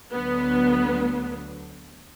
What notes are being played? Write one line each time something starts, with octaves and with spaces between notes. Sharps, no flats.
D2 D3 F#3 B3